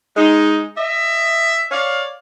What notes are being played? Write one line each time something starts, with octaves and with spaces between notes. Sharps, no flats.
G#3 D#4
D#5 E5
C#5 D5 F5